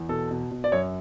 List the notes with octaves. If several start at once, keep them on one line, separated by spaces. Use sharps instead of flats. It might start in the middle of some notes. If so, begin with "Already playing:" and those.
Already playing: E2
B2 A4
B2
B2
D5
F#2 C#5